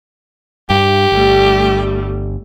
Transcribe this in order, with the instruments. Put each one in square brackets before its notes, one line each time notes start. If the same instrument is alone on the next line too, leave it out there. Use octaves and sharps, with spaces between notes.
[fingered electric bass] G2 G3 [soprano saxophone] G4
[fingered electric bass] G1 [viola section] G3 A3